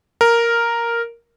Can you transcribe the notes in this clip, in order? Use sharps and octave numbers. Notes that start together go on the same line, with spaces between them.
A#4